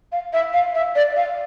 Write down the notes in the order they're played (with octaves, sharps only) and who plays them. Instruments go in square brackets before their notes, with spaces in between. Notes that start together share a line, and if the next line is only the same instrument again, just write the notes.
[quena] F5
E5
F5
E5
D5
F5